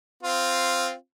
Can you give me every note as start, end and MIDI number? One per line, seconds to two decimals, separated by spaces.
0.23 0.93 60
0.23 0.93 65